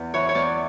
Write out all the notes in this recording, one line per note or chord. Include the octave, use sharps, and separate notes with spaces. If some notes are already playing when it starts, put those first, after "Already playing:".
Already playing: E2
E3 C#5
C#5
E2 D5